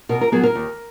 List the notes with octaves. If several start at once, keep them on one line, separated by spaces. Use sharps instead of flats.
B2 A#4
A#4
F#3 B3 G#4
A#4
D#2